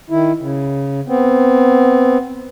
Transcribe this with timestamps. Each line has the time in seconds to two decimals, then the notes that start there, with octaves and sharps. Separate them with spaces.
0.10 D#3 E4
0.40 C#3
1.08 B3 C4